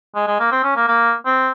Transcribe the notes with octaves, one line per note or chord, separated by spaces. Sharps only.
G#3
G#3
A#3
C4
C#4
A#3
A#3
C4